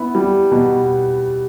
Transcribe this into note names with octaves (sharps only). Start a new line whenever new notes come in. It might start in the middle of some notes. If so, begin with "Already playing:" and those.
Already playing: B3 E4
G3
B2